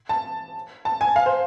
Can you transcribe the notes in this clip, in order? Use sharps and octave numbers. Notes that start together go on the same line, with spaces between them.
A5
A5
G#5
F5
C5